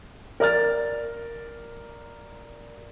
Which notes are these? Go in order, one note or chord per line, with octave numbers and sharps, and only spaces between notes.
A#4 D5 F6 A6